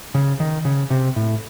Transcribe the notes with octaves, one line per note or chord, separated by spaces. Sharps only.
C#3
D#3
C#3
C3
A2